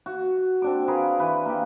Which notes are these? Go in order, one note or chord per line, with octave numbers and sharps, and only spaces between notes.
F#4
C4 D4 D6
F4 G#4 A#4 B4
E3 B4 D6
A#3 G4